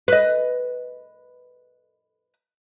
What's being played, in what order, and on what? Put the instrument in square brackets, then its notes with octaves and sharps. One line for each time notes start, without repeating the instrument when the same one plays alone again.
[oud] B4 D#5